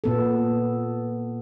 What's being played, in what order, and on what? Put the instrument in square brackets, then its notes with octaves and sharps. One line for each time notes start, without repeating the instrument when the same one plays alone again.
[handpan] A#2 B3 A4